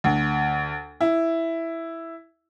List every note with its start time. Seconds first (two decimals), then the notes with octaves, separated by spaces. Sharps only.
0.04 D2
1.01 E4